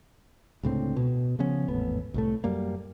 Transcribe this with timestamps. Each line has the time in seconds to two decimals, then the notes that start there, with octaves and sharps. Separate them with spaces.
0.63 C#2 A2 D3 C4
0.96 B2
1.39 C#3 F3 B3 C#4
1.68 G#1 E2 A2 B3
2.14 C2 A2 A3
2.44 F#2 G3 A#3